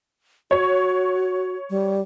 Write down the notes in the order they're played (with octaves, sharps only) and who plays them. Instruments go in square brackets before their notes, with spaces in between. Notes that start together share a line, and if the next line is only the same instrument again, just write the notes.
[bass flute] F#4 [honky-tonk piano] C#5
[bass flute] G3